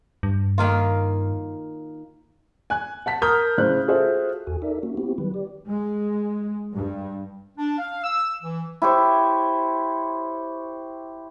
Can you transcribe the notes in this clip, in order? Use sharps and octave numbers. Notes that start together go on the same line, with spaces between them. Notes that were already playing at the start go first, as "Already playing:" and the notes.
G2
D#3 A#3 F4
G#5 F#6
F#5 A5 B6
A#4 A5 A#5 D#6 F6 G6
A2 C#3 C5 F#6
F4 F#4 G#4 A4 C5 E5
E2 F#4 A4 G#5
D#4 A4 A#4 D5 E5
A#3 C#4 F#4
B3 C4 E4 F#4 G4
D#3 F#3 G3 B4
G4 D5
G#3
G2
D4
F5
E6
E3
E4 G4 C5 C#5